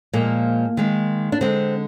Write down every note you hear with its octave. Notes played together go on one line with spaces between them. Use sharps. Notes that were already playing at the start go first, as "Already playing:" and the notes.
A#2 F3 G#3 A#3
D#3 G#3
D4
D3 G#3 C4